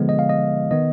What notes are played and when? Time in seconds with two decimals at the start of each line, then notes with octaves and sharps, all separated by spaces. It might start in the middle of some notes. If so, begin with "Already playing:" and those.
Already playing: D3 F3 G#3 B3
0.09 D#5
0.19 F5
0.29 D#5
0.71 D#3 B3 D#5